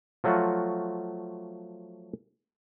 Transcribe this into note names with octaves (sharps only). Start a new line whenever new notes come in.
F3 F#3 A3 F4 F#4